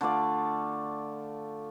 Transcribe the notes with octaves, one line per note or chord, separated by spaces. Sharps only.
D3 A3 F4 D5